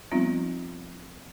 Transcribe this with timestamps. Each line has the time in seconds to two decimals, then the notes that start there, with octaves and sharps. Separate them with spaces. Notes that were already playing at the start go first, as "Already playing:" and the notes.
0.11 F3 G3 B3 C4 D#4 F4